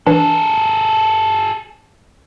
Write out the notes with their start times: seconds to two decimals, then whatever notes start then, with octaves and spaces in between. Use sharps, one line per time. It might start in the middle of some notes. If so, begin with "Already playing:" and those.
0.07 E3 D4 G#4 A4